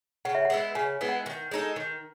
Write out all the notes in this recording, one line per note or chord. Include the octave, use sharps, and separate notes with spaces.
C#3 F#5
E5
F#5
G#3 B3 E4
C#3 G#5
G#3 B3 E4
F#5
D#3
G#3 D#4 A4
D#3